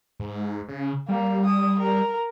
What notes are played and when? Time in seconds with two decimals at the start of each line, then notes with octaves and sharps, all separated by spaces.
0.20 G#2
0.68 C#3
1.09 G3 A#3
1.45 D#6
1.80 A#4